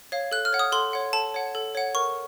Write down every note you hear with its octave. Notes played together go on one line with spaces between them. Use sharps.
C#5 F5
A4 F#6
F6
C#5 F#5
D#6
A4 C6
C#5 F#5
A4 A5
C#5 F#5
A4
C#5 F#5
A#4 C#6